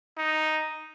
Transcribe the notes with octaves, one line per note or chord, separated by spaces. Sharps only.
D#4